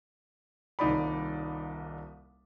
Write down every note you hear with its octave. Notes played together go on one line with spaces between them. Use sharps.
D#1 C2 D#4 D5 B5